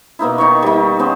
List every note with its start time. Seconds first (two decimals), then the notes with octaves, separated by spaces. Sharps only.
0.19 B2 A#3 D#4 E4
0.38 D#3 D#4 C#5 C#6
0.63 G3 D#4
0.99 B3 C#4 C5